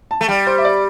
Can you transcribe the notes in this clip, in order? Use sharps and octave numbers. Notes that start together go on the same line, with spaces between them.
A5
A3
G3 G5
C5
E5
D5